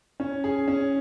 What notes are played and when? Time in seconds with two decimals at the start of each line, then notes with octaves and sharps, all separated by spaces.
0.20 C#4
0.44 G#4
0.68 C#4